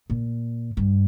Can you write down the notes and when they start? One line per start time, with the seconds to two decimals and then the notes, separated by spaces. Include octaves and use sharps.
0.10 A#2
0.77 G2